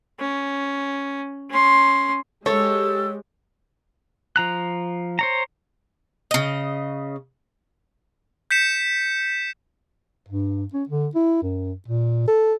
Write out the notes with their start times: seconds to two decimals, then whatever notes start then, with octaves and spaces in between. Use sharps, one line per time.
0.20 C#4
1.51 C#4 C6
2.46 G#3 G4 A4 C#5 E6 A6
4.36 F3 A#5 F#6
5.19 C5 C#5 A#5
6.31 C#3 D#5
8.51 G6 B6 C#7 E7
10.29 G2
10.74 C#4
10.89 D3
11.15 E4
11.43 F#2
11.88 A#2
12.28 A4